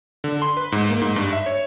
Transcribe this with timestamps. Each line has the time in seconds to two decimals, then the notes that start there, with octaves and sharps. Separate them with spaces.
0.24 D3
0.42 C6
0.57 B4
0.72 G#2
0.90 A#3
1.01 G#2
1.16 G2
1.33 E5
1.46 C#5